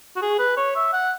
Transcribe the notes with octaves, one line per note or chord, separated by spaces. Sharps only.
F#4
G#4
B4
C#5
E5
F#5